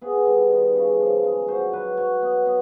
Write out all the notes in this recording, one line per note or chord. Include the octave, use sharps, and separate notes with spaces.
B3 G#4
G3
D#3
C#3
F3
G#3
F#3 C5
F#3 B4
F#3 C#5
B3
B3